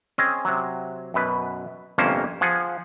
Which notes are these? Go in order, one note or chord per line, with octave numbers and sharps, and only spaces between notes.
C4 C#4 G#4 D#5
C3 F#3
F#2 B2 B4
G1 F2 C3 A#3 C#4 C5
F3 G#4 F#5